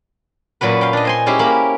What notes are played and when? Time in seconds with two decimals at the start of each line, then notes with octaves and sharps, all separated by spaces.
0.61 F#2 A#2 F#3 F#4 B4
0.81 F5 G5
0.93 D4 D#5
1.05 C5 G#5 C6
1.26 G#3 C#4 E4 G4 C5
1.39 A#3 A#5 B5